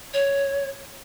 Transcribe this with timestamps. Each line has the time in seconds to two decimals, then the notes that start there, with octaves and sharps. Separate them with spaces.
0.14 C#5